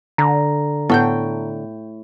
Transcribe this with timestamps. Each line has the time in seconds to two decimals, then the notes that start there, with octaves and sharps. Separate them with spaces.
0.18 D3 A#5
0.90 A2 B3 F#5 G5 G6